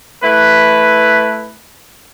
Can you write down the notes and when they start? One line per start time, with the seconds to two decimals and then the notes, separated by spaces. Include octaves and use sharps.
0.23 A3 E4 B4